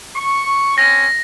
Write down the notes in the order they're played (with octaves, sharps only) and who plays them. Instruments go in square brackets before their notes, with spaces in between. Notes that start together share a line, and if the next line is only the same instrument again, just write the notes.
[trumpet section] C#6
[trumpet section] C4 C#4 [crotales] A#6